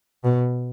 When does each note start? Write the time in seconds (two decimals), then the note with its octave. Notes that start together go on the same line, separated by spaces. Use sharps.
0.24 B2